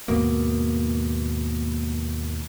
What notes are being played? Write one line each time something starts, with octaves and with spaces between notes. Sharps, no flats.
D#2 G#2 B2 A#3